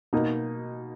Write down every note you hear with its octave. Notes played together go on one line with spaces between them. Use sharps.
B2 A#3 D#4